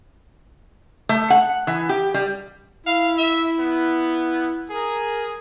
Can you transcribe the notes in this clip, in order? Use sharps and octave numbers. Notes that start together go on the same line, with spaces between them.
A3
F#5
E3
G4
G3
E4 F5
E5
B3
G#4 A#4